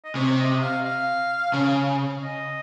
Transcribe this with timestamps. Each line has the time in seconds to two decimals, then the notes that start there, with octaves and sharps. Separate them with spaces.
0.05 D#5
0.15 C3 C#5
0.39 D#5
0.62 F5
0.85 F5
1.54 C#3
2.23 D#5